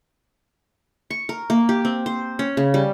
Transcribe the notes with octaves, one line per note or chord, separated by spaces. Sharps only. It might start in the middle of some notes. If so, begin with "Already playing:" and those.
C#6
A#4
A#3
G4
C4
C5
C#4
C#3
G3